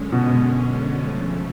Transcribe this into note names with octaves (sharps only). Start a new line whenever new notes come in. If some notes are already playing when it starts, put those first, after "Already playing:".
Already playing: F#2 D3 G#3 C#4
B2
C#3 F3 A3